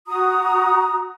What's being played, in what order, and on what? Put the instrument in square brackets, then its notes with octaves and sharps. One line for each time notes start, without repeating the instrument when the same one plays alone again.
[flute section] F#4 A#5 D#6